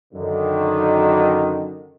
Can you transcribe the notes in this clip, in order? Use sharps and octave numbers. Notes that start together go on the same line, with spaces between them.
F#2 D3 D#3